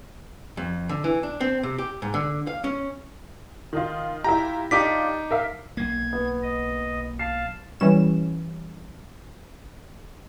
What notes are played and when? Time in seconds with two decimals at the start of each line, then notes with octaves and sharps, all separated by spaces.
0.57 F2
0.89 D3
1.04 E3
1.23 D4
1.40 C4
1.63 C3
1.78 G4
2.02 G#2
2.14 D3
2.47 F5
2.64 C#4
3.73 D#3 D#4 F4
4.24 E4 F4 G4 A#5
4.71 D4 D#4 F4 G4 D6 B6
5.31 A#4 E5 F5
5.77 B1 A#3 G#6
6.13 B3
6.43 D#5
7.19 F5 A5 C7
7.80 E3 G3 C#4 E7